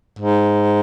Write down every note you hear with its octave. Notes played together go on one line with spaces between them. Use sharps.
G#2